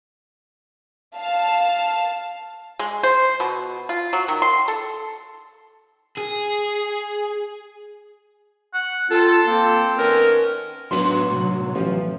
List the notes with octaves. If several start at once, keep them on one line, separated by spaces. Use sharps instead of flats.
F5 A5
G#3
C5
B2
F4
F#3
D#3
C6
A4
G#4
F#5
C4 F4 A4
A#3 C4
D#3 B3 C#4 A#4
A2 F#3 B3 D4 B4 C6
A2 C3
A1 F3